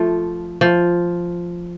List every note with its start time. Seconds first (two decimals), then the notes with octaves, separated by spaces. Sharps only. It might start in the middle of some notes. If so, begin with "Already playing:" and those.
Already playing: F3 A3
0.61 F3